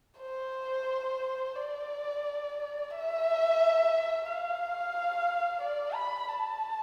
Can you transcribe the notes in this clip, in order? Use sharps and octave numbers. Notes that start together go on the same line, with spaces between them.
C5
D5
E5
F5
D5
B5
A5